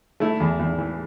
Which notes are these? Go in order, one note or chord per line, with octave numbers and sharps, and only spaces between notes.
A3 E4
E2
E2
E3